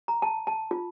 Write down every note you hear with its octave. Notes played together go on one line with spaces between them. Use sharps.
A#5
A5
A5
F4